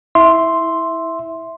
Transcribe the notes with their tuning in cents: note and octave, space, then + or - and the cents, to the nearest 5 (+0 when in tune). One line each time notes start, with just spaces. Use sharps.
E4 -20 E5 +0 C6 +0